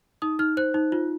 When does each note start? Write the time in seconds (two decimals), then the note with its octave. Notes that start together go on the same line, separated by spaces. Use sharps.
0.22 D#4 D#6
0.39 D#4 F6
0.57 C5 F#6
0.74 D#4
0.92 F4